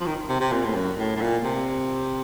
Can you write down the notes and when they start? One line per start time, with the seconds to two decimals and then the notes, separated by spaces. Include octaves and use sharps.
0.01 F3
0.06 D#3
0.29 C3
0.41 C3
0.52 A#2
0.65 A2
0.75 F#2
0.98 A2
1.16 A2
1.21 A#2
1.44 C3